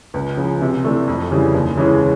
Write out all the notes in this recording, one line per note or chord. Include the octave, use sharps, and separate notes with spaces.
C#2
C#3 F3
C3
E3 A3 D4
F2
C#3 E3 G3
D#2
C#3 E3 G#3 C#4